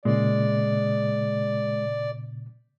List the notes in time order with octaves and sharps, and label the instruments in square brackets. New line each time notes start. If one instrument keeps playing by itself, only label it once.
[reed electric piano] A#2 C#3 [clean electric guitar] G#3 [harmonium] D5